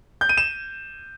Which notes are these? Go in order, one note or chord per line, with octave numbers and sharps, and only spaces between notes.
G6
D#7
E7